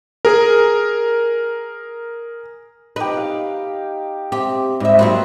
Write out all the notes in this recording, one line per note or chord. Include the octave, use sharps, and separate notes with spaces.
G#4 A#4
D#4 G4 B4
F5
C4 G4 E5
G#2 G3 D#5 E5
F#3 A#3 C4 E4 F4 B4